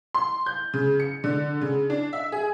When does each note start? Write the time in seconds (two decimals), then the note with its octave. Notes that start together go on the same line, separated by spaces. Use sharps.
0.14 C6
0.46 G6
0.74 C#3
1.00 C#7
1.24 D3
1.61 C#3
1.90 D4
2.13 E5
2.32 G#4